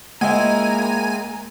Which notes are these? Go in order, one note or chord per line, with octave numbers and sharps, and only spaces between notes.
C#2 G#3 A#3 C4 E4 G#5 A#5